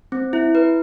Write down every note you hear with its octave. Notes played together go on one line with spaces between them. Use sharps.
C4
E4
B4